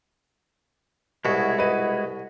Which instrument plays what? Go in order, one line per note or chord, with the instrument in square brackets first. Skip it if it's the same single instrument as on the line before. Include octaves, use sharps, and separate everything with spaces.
[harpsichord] C2 B2 [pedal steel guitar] G#3 E4 F#4
[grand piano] B4 D#5 D#7